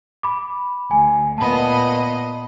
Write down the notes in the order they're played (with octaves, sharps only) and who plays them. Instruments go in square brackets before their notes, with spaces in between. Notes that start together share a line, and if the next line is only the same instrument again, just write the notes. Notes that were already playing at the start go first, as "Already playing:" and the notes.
[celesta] B5 D6
[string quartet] D2 [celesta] G#5
[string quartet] A#2 B3 D#5 [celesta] A5 B5